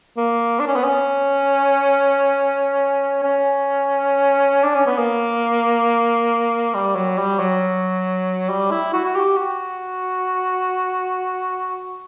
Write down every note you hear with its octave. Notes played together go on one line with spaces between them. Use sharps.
A#3
D4
C#4
B3
C#4
C#4
D4
C#4
B3
A#3
G3
F#3
G3
F#3
G3
E4
F#4
F#4
G4
F#4